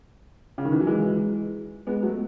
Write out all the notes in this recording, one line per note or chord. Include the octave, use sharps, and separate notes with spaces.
C#3
D#3
E3
F#3
E3 G#3
G#3 B3
F#3 A3